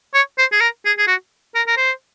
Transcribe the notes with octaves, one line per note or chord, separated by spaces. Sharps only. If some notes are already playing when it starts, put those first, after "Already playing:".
C#5
C5
G#4
A#4
G#4
G#4
F#4
A#4
A#4
C5